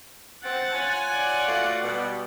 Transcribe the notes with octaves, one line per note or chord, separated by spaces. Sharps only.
C4 F#5 A6
F4 C#5 G#5
D5 F#5
A3 F4 F#4
B2 G3